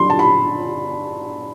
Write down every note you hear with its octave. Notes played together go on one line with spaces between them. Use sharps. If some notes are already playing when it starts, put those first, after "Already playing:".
Already playing: G2 F#3 C6
A5
B5